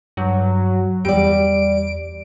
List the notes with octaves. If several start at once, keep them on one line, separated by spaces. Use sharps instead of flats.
G2 F#3
E2 G3 D5 D7